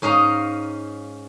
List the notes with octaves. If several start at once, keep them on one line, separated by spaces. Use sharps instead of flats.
G#2 C#4 D#5 F5 A#5